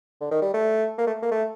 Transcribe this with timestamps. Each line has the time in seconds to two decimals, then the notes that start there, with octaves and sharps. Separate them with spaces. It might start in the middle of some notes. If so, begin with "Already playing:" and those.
0.21 D3
0.31 D#3
0.42 G3
0.54 A3
0.98 A#3
1.07 A3
1.22 A#3
1.31 A3